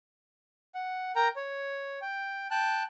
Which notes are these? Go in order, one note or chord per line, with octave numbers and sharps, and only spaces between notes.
F#5
A#4 G5 A#5
C#5
G5
G5 A5 F#6